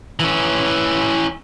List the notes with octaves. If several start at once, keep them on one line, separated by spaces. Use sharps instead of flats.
E3 C#4